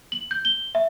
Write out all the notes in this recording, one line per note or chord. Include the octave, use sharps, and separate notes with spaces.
F#7
G6
G7
E5